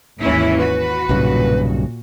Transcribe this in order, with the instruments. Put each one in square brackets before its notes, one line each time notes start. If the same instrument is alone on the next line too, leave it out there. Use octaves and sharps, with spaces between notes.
[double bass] G#1 D#2 [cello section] E3 C#4 E4
[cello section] F#4 [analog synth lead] B4
[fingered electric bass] B1 G2 C#3 [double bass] A#2